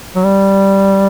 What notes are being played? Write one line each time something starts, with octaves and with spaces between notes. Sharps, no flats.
F#3
G3